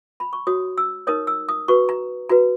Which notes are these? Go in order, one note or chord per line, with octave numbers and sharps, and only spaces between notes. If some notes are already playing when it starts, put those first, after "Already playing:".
B5
C#6
F#4 C#5 D#6
E6
D#4 A#4 C#5 D#6
E6
D#6
F#4 B4 C#6
A#5
F#4 B4 A#5